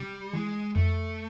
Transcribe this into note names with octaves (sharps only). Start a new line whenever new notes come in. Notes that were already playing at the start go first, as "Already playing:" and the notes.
Already playing: C3 G3
E3 G#3
F2 A3